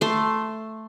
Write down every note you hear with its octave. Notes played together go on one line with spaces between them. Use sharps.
A3 C6